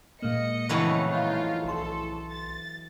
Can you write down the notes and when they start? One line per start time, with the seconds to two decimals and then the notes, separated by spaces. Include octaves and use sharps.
0.22 A#2 G#3 A#3 D#5 C#7
0.69 F2 A2 C#3 E3 F#3 B4
1.08 D#4 F4 F5
1.64 B1 A4 C6
2.31 A6